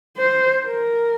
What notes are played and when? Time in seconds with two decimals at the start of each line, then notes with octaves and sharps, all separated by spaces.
0.18 C5
0.65 A#4